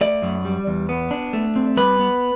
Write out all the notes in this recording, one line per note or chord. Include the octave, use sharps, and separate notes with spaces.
A3 D5
F#2
G3
E2
B3
D4
A3
C4
G3 B4
B3